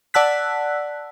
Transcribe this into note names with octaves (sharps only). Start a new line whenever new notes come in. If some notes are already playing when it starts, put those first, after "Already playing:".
D5 F#5 A5 E6 F#6 B6